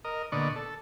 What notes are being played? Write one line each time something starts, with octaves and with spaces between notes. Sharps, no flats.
A#4 D#5
A#2 D3 B3 D5 D#5 C#6
A4